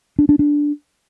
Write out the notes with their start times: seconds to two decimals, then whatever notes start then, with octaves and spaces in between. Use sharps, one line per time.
0.19 D4
0.29 D4
0.39 D4